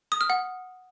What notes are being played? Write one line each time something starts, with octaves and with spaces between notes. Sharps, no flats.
D#6
F6
F#5